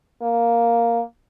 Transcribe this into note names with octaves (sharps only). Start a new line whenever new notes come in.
A#3